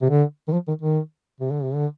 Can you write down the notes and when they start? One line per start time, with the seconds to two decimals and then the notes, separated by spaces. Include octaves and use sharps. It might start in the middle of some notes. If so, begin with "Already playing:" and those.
0.02 C3
0.10 D3
0.48 D#3
0.53 F3
0.68 D#3
0.82 D#3
1.40 C3
1.51 D3
1.63 C3
1.75 D3